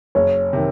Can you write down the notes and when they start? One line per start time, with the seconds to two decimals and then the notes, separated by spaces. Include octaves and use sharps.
0.15 F#1 C#5
0.53 C3 D#3